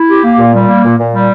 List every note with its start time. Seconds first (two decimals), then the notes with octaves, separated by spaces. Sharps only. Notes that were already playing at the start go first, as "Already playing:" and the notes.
Already playing: E4
0.09 G4
0.24 A#3
0.38 A#2
0.53 G3
0.68 A#3
0.83 A#2
0.98 A#2
1.13 G3